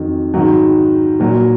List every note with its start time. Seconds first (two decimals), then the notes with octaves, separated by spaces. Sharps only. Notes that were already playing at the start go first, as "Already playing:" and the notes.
Already playing: F2 D#3 F#3
0.34 G#2 D#3 F#3
1.20 A#2 F#3